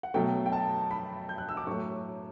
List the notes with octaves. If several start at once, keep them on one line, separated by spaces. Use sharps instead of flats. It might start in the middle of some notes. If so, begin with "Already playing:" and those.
F#5
B2 F#3 A3 G5
G5
A5
B5
G6
F#6
E6
D6
A2 F#3 A3 C#6